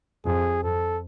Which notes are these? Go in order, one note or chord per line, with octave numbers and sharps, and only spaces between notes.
F2 G#4
F2 A4